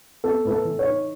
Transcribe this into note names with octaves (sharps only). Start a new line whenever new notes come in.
B3 A4
A2 B4
A4
E3
C#5
D#4